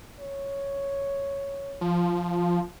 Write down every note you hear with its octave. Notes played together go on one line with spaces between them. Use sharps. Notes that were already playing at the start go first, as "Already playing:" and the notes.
C#5
F3